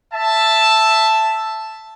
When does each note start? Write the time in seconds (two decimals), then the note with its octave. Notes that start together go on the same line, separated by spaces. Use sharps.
0.13 E5 A5